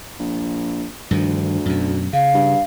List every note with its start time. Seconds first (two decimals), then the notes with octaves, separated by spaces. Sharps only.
0.19 A#1
1.11 D2 G2 D#3 F3
1.66 F#2 B2
2.13 C#3 F5
2.34 G2